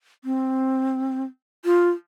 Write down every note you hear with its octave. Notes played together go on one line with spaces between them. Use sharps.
C4
F4